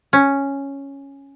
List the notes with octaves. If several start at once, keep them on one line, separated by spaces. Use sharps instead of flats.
C#4